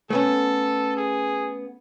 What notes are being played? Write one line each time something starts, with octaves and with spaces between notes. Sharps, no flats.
A3 B3 C#4 A4
G#4